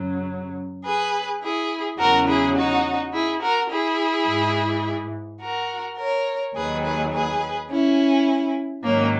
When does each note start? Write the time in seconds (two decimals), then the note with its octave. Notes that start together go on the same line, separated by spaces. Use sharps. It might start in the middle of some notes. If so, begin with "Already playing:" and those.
Already playing: F#2 C#3 F#3
0.85 G#4 B4
1.43 E4 G#4
1.99 E2 C#3 F#3 F#4 A#4
2.28 E4 G#4
2.57 D#4 F#4
3.14 E4 G#4
3.42 F#4 A#4
3.71 E4 G#4
4.28 G#2 E3
5.42 F#4 A#4
5.99 A#4 C#5
6.56 D#2 D#3 F#3 G#4 B4
6.85 G#4 B4
7.14 G#4 B4
7.71 C#4 E4
8.84 G#2 D#3 F#3 A#3 C#4